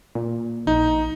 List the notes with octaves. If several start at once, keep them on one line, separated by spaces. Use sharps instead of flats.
A#2
A#1 D#4